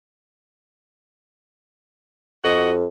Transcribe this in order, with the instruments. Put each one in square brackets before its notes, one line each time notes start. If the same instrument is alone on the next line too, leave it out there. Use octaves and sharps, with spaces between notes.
[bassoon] F2 [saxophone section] F#4 D#5